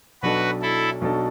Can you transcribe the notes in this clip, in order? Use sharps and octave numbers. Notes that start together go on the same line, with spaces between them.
B1 B2 F#3 D4 F#4 A4 B4
E4 A4
B1 B2 F#3 D4 A4